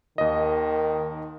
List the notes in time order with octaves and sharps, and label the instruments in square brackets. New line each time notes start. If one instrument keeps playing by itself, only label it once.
[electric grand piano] D#2 D#5 [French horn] D#3